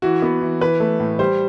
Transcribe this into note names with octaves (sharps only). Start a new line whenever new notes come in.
E3 F#4
B3
E3
E3 B4
A3
A2
G3 C5